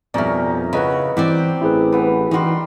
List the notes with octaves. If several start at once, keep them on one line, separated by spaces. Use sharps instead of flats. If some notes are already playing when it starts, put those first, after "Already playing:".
F2 B2 G3 C#4 D#4 A#4 D5 E5
C#3 E4 F#4 B4 D#5 B5
E3 G3 C4 G4 D5 F#5 D6
A1 E4 G#4 B4
E3 B3
D#3 E3 G3 D#4 F#4 C6